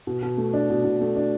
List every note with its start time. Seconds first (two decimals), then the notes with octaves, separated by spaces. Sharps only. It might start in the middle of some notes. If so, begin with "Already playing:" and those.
0.07 B2
0.23 B2
0.38 A3
0.54 D4
0.70 B2
0.85 B2
1.01 A3
1.16 D4